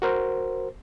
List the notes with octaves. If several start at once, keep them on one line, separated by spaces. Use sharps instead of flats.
F#4 A#4 C5